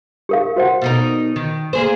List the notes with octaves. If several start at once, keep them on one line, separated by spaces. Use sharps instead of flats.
G4 A#4 F5
F#4 C5 F#5
B2 D#4 A#4
D#3
A#3 G#4 C5